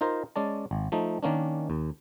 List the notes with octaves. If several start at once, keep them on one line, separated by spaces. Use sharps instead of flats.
D#4 F4 A#4 C5
G#3 C#4 D5 A5
G#1
F3 A3 D#4
D#3 A#3 C#4 D4
D#2